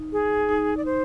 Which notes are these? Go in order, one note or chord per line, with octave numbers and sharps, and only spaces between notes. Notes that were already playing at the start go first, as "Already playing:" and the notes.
Already playing: D#4
G#4
D#4
D5
C5